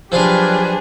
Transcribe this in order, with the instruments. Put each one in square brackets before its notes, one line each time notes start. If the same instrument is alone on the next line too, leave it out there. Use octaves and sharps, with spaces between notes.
[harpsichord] F3 F5 [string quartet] F#3 D4 G#4 [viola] G4 B4